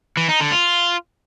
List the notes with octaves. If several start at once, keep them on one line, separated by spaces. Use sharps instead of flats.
E3
D#4
D3
F4